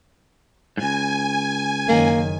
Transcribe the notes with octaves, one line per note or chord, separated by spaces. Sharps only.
C#2 G#2 G#5
F#1 D#3 A#3